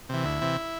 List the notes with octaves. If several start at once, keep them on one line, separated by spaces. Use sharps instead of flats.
C3 E3
D2 E4
C3 E3